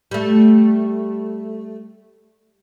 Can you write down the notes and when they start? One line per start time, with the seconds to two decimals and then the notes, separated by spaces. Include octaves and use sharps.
0.11 G3 A3